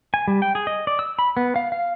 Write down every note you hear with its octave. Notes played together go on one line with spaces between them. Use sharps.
G#5
G3
G5
G#4
D#5
D5
E6
B5
B3
F5
F5